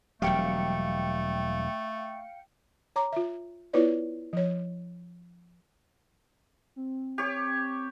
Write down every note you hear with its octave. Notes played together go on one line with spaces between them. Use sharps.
E1 F#3 G3 A3 F5 G5 C#7
C#5 A#5 D6
F4 E5
B3 E4 F4 B4 C#5 D5
F3 C#5
C4
G4 C#5